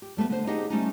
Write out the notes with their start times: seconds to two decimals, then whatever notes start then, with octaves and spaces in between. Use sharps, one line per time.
0.02 G4
0.17 G3 A3 B3 B4
0.30 D3 C5
0.47 D#4 G4 G#4 D#5 F#5
0.70 G3 A3 C#4 D#4